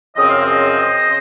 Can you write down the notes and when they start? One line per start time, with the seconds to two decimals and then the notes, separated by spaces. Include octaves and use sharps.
0.16 F#2 C#3 F3 C4 D#5
0.28 F5
0.40 C5 D#5
1.05 C#3